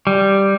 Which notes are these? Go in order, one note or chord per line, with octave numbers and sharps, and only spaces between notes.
G3